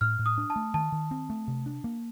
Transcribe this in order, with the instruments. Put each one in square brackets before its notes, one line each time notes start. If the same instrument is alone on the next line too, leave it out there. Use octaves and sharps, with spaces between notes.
[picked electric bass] A2 [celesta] F6
[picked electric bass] A2
[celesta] D#6
[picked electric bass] D4
[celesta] A5
[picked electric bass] A3
[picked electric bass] D#3 [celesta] A5
[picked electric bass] D#3
C4
A3
C3
D4
A#3